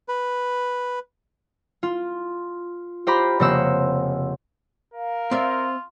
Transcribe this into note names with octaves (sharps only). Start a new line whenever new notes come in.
B4
F4
F4 G4 C5 A#5 B5
F1 C#3 A#3 C5 F#5 E6
A#4 F5
C4 F4 D5 E5